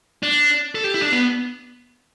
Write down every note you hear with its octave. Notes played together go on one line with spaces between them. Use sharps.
D4
A4
G4
E4
D4
B3